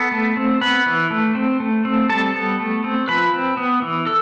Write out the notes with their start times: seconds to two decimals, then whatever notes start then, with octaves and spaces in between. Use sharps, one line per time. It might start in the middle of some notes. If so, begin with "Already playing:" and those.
Already playing: B3 A4 A5
0.12 A3
0.37 C4
0.61 B3 B4 B5
0.86 E3
1.11 A3
1.35 C4
1.60 A3
1.85 C4
2.09 G3 A4 A5
2.34 B3
2.60 A3
2.84 C4
3.08 F3 B4 B5
3.33 C4
3.57 B3
3.82 E3
4.06 A4